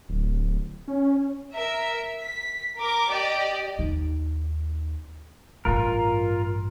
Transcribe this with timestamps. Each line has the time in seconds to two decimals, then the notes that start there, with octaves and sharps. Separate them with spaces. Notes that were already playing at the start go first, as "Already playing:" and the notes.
0.09 D1
0.88 C#4
1.54 A#4 E5
2.20 B6
2.78 A#4 D6
3.09 G4 D5 D#5
3.79 D#2 D#4
5.65 A1 G2 F4 A#4